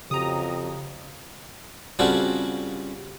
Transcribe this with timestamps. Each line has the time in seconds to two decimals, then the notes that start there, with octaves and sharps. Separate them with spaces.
0.11 F2 C#3 F#3 C#4 G4 A#5 D#6
1.99 C#3 G3 C4 F4 F#4 A4